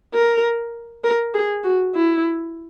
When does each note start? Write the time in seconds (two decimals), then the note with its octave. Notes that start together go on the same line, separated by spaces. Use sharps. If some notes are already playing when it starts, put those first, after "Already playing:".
0.14 A#4
1.04 A#4
1.34 G#4
1.64 F#4
1.95 E4